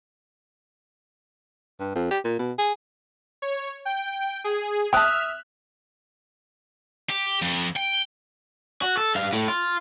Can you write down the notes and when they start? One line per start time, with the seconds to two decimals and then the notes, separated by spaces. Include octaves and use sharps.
1.80 G2
1.95 F2
2.11 G4
2.24 A#2
2.39 B2
2.58 G#4
3.42 C#5
3.85 G5
4.44 G#4
4.93 E5 G5 A5 D#6 F6 F#6
7.09 G4
7.42 F2
7.76 G5
8.82 F#4
8.97 A4
9.15 G2 F5
9.33 A2
9.48 F4